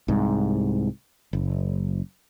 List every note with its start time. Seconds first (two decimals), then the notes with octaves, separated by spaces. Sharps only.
0.08 C2 G#2
1.33 F#1